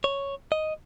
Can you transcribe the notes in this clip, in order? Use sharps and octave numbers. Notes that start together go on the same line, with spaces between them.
C#5
D#5